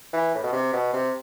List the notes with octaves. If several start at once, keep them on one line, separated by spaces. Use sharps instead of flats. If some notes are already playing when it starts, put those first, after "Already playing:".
E3
A2
B2
C3
B2
C3